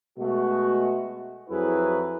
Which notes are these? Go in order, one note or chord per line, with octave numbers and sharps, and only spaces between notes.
B2 G#3 A3 F#4
F2 F3 F#3 E4 G#4 B4